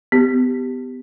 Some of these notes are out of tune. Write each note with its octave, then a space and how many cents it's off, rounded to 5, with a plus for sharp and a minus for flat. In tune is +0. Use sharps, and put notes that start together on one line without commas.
B3 +30 G4 +0